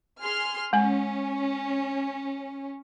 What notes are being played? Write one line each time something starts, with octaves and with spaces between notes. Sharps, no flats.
G#4 C6 F6
G#3 C#4 G#5